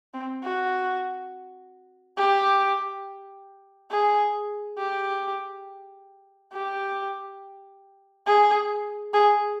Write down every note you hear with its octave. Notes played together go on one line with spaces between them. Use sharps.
C4
F#4
G4
G#4
G4
G4
G#4
G#4